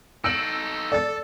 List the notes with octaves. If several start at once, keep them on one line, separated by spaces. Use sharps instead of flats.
D#4 A4 E6 D7 F#7
A4 D5 A6